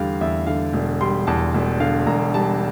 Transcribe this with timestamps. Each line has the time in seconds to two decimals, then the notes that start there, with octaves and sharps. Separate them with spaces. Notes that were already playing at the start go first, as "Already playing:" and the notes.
Already playing: E2 D3 G3 F5
0.21 E2 E5
0.47 D3 F5
0.73 E1
1.01 G3 C6
1.27 E2 A5
1.54 E1
1.80 D3 F5
2.06 E1 A#5
2.34 G3 A5